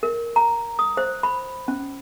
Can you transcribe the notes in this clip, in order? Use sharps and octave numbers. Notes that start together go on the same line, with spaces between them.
A#4
A#5
D#6
C5
B5
C#4